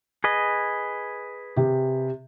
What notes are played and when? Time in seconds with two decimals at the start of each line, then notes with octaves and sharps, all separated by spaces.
0.24 G#4 B4 D#5
1.56 C3 G4